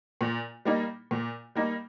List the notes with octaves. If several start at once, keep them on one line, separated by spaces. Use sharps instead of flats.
A#2
G3 A#3 D#4
A#2
G3 A#3 D#4